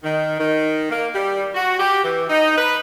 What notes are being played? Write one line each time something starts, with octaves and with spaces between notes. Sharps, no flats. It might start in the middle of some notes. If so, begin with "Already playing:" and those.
D#3
D#3
A#3
G3
F#4
G4
E3
D#4
B4